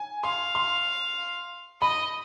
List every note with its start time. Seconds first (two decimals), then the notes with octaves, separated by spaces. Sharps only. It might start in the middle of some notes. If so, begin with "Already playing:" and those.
Already playing: G#5
0.23 F5 C6
0.55 C6
1.81 D#5 B5